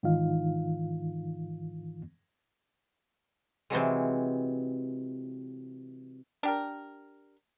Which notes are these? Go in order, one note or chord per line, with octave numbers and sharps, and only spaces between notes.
G#2 D#3 E3 D#4 F4 F5
C3 E3 F#3 G#3
D4 G4 A#4